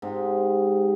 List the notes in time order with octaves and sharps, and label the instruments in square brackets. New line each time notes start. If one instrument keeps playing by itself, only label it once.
[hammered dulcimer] G#2 C3